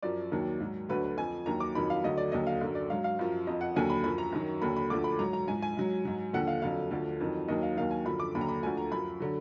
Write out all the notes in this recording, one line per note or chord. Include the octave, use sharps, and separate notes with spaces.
F#2 F3 D5
D#2 D#3 F#3
G#2 F#3
D2 D3 F#3 B4
B4
F2 F3 G#5
D#2 D#3 F#3 A#5
D6
F2 D#3 F#3 B5
F5
D2 D3 F#3 D#5
D5
D#2 D3 F#3 D#5
F5
F#2 D3 F#3
D5
G#2 F#3 F5
F5
F#2 F3
F2 F3 D#5
F#5
D#2 D3 F#3 G#5
B5
F#2 F3 B5
A#5
F#2 D#3 F#3
D#2 D3 F#3 B5
B5
D2 D3 F3 D6
B5
G#2 F#3 A#5
A#5
G#2 F3 G#5
G#5
G#2 F#3
G#2 F#3
D#2 D3 F3 F#5
F5
F2 D3 F#3 F5
D2 D3 F3
F2 D#3 F#3
D#2 D#3 F#3 D#5
F5
D#2 D#3 F#3 F5
G#5
F#2 D3 F3 B5
D6
D#2 D3 F#3 B5
A#5
B5
D2 D3 F3 G#5
A#5
F#2 F3 B5
D3 F#3